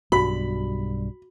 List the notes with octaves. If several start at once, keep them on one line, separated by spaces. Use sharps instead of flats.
B1 G2 G3 F#4 B5